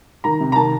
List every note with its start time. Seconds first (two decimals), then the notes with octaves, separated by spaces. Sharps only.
0.24 D#3 A#5
0.40 C3
0.52 A#5
0.56 D#3 A5